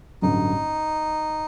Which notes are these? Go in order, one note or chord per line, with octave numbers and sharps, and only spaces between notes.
A1 G2 D3 F#3 D#4